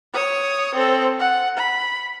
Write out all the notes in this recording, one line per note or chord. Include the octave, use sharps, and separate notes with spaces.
C#5 D#6
C4 A4
F#5
B5